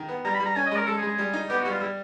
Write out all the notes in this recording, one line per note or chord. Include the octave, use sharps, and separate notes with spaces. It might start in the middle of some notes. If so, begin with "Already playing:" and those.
Already playing: D#3
B3
G3 A#5
B5
G3
A#5
C#4 G#5
D#5
G#3
A#4
G#3 A4
G#4
G#3
G#4
G3
D#4
B3 G4
F#4
G3
F4
G3 E4